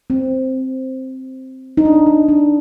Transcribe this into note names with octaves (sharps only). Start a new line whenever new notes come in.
C4
D#4
D4
D#4
D4